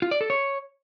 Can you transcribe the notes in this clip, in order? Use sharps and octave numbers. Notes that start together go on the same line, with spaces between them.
F4
D5
A4
C#5